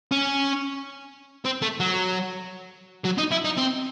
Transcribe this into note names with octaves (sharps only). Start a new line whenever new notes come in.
C#4
C4
A3
F#3
F#3
D#4
E4
D#4
C4